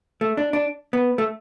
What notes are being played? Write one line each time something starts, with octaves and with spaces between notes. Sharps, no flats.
A3
D4
D4
B3
A3